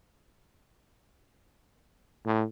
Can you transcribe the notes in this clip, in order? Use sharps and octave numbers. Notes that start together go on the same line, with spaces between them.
A2